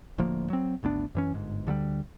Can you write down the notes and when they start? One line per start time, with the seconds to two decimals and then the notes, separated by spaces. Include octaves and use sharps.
0.18 D1 D2 F3 A#3
0.50 F#3 C4
0.83 G#1 D2 B3 D4
1.15 F#2 E3 C#4
1.34 G1 G#2
1.67 D2 D3 F#3 G3